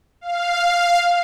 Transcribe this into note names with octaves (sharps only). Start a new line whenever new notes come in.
F5